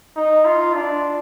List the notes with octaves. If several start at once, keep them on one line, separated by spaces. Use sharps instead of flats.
D#4
F4
D4